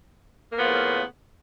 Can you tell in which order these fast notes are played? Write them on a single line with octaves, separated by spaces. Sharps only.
A#3 B3 F3 C#3 A2